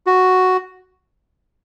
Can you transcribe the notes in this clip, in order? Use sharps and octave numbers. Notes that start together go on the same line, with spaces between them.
F#4